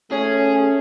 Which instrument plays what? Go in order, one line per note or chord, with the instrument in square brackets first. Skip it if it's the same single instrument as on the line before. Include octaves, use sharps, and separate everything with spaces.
[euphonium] A3 [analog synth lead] C#4 [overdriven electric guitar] G#4 [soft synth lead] C#5